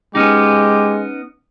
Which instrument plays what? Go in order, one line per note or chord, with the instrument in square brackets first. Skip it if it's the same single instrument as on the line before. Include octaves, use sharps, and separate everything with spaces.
[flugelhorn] G#3 [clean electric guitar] B3 C#4 D#4 [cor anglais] G4